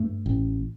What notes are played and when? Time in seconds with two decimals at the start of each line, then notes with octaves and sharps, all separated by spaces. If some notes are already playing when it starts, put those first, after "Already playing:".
Already playing: G2 A3
0.26 A1